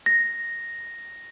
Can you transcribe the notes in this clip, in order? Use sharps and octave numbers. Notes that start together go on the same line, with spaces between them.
A#6